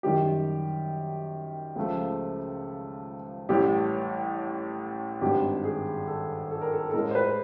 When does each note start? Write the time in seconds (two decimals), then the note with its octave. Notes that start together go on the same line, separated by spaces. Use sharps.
0.03 F#2 D#3 G3 G4
1.76 C#2 C#3 F3 A3
3.49 A1 A2 E3 G3 G4
5.21 G#1 G2 D#3 G3 G4
5.64 G#4
6.07 A4
6.51 A4
6.61 A#4
6.73 A4
6.90 A4
6.93 A1 A2 E3 G#3 A#4
7.11 C5
7.15 B4